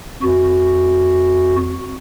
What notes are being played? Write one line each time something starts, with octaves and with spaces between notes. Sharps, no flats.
F2 F#4